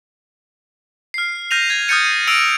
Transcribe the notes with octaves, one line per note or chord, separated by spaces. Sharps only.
F6 C7
F6 G6 A#6 D#7 F7
G#6
D#6 F6 G6 A6 C#7 D#7
D#7
E6 A#6 D7 F7